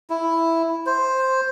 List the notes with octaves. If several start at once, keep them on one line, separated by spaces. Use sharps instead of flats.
E4
C5